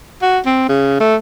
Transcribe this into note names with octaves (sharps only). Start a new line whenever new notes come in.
F#4
C4
C#3
A3